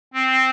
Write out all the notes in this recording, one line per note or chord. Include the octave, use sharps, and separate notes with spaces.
C4